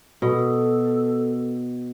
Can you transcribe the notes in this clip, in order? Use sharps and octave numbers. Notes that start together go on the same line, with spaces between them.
B2 A4